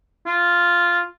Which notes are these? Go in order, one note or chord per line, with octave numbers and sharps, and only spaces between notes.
F4